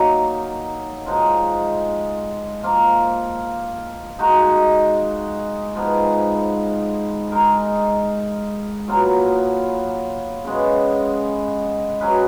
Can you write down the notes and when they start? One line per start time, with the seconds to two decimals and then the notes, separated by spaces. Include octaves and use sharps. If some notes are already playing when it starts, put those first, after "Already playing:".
Already playing: D#3 F#3 A#3 D#4
1.06 F3 G#3 D#4
2.63 F3 A#3 F4
4.19 G#3 D#4 F#4
5.75 G#2 F3 B3
7.32 G#3 D#4 A#4
8.88 A#2 F#3 B3 F4
10.45 C#3 G#3 B3
12.01 F#3 C#4 G#4 B4